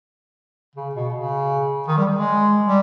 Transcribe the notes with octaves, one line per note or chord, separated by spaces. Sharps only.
C#3
B2
C#3
D#3
G3
G#3
G3